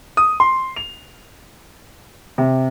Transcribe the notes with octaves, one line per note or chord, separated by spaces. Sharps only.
D#6
C6
F7
C3